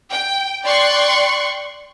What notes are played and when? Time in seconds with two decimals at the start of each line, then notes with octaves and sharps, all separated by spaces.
0.10 G5
0.63 D5 G5 C6 C#6 F#6